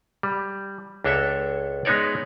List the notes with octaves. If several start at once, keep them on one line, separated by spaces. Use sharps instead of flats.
G3
C#2 D4 A4 C#5 E5
G#3 B3 D#4 C#5 D5